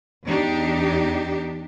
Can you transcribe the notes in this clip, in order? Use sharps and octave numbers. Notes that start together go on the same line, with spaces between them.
E2 D4 D#4 G4